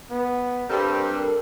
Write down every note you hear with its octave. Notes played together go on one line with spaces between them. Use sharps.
B3
G2 G3 C4 G4 A4 A#4